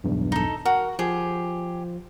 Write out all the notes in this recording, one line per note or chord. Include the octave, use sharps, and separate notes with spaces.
B1 E2 G2
D#4 A4
F#4 A#4
F3 G4 G#4